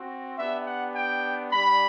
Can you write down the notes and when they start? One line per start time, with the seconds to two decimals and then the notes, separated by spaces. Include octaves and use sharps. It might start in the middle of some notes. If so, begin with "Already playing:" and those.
Already playing: C4 F#4
0.37 B3 D4 G4 E5
0.66 F#5
0.95 G5
1.52 G3 D4 G4 B5